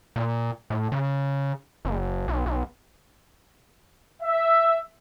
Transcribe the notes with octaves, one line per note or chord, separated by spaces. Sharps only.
A#2
A2
C#3
F#1
B1
B1
E5